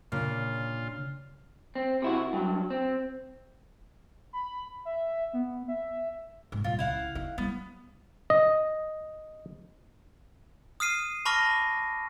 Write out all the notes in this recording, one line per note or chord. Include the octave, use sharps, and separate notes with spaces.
A#2 C#3 D4 F4
C4
C3 E4 F#4
G2 F#3
C4
B5
E5
B3
E5
G#2
A#2 G3 F4
C#2 E4 F5 F#5
D#4
G3 B3
D#5
D#6 F6 C7 D#7
A5 B5 C#6 D6 F6 A#6